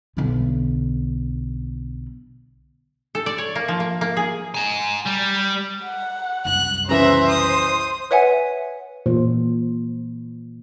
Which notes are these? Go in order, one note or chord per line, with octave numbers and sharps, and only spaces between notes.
B1 D3
A4
D5
C#5
A#3
F3
A#3
A#3
G#4
G#5 A#5
G3
F#5
C2 F#2 F#6
C#3 E3 C5 E5 A#5
D#6
B4 C#5 E5 F#5 G#5
A#2 E3 C5